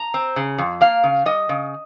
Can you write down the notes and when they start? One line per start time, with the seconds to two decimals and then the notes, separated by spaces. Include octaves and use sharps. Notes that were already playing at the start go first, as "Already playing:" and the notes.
Already playing: A#5
0.14 C4
0.36 C#3
0.58 F2
0.81 A#3 F5
1.04 C#3
1.26 G3 D#5
1.49 C#3